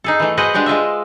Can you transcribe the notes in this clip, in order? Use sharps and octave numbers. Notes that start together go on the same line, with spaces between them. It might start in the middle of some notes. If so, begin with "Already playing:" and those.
D#4 G#4 A4
E3 A3
F#4 G#4 B4 C5 D#5 F#5
G#3 D4 F#4 G4
G#3 F4 D#5 E5